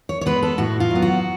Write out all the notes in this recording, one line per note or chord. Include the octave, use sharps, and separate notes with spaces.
C#5
C#5
G#3 B3 B4
A4
A2 F#4
F4
F#3 B3
F#4